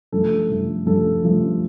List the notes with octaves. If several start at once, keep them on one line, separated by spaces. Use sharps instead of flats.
G2 F3 A3 A4
G2 F3 A3
G2 F3 A3 A4
G2 F3 A3